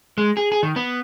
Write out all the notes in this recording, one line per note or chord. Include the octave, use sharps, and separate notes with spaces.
G#3
G#4
G#4
D#3
B3